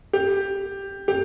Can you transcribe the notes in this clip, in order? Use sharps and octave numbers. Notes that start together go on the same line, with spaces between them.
G4
G4